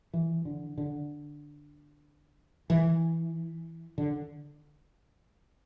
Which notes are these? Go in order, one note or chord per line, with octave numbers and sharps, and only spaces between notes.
E3
D3
D3
E3
D3